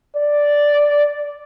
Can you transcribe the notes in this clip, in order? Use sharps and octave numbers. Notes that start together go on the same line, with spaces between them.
D5